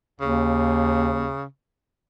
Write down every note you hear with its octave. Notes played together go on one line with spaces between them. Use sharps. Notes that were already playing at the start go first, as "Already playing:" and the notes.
D#2 C#3